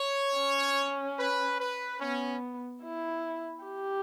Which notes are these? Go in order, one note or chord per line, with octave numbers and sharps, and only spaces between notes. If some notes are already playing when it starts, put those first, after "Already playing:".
Already playing: C#5
C#4
B4
B4
B3 C#4
E4
G4